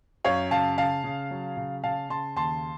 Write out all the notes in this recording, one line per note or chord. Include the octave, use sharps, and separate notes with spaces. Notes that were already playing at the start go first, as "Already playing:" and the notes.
F#2 C#5 F5
C#3 F5 A5
C#3 F5 A5
C#3
F#3
C#3
C#3 F5 A5
C#3 A5 C6
D#2 A5 C6